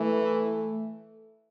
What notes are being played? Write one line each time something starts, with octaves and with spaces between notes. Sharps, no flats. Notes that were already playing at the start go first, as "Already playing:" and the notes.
Already playing: E3 A3